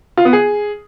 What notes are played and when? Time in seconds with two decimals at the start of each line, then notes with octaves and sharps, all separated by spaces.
0.17 F4
0.25 B3
0.33 G#4